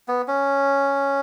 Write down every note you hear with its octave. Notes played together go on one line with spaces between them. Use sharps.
B3
C#4